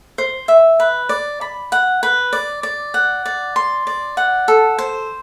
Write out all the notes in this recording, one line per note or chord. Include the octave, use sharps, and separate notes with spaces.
C5
E5
B4
D5
B5
F#5
B4
D5
D5
F#5
D5
C6
D5
F#5
A4
C5